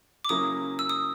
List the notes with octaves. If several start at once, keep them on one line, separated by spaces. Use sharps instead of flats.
D6
C#3 F#3 A#3 C#4 E4 D#6
E6
D#6